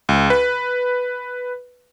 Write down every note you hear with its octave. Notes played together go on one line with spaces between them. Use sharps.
C#2
B4